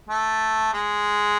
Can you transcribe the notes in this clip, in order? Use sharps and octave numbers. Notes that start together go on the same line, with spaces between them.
A3
G#3